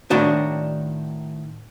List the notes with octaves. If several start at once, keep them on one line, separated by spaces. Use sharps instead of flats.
A2 D#3 D4 F#4